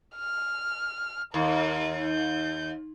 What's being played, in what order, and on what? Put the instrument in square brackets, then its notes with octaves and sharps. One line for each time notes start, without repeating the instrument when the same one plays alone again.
[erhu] F6
[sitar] D#2 [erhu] A#4
[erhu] G6